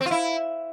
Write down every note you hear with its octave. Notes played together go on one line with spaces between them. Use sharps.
C4
F4
E4